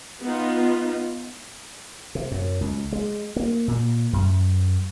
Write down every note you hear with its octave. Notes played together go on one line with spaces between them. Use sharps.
B3 D#4 F4
C3
F#2
C#2
G#3
A#3
A#2
F#2